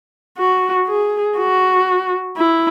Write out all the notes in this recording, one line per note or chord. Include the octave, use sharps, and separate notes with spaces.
F#4
G#4
F#4
E4